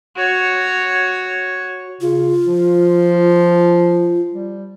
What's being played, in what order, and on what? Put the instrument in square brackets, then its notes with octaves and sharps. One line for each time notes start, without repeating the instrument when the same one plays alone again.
[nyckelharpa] F#4 C#5
[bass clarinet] C#3 [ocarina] F4
[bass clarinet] F3
G3